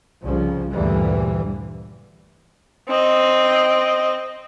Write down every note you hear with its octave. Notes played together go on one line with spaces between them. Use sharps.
C2 C#3 F3
D2 G2 A#2 E3 G3
C4 D#5